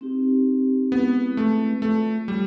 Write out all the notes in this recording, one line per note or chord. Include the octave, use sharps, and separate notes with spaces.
C4 D#4 G4
G#3 B3 C4 E4 G#4 B4
A3
A3 F4 G#4 C#5 E5
G3